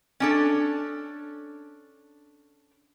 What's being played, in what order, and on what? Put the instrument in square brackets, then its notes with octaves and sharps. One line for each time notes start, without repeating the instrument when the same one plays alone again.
[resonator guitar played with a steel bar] C#4 D4 A4